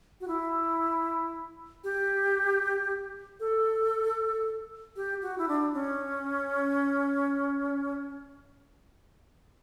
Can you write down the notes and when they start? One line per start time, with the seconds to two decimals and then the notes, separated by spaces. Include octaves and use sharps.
0.21 F#4
0.28 E4
1.84 G4
3.40 A4
4.96 G4
5.22 F#4
5.38 E4
5.48 D4
5.74 C#4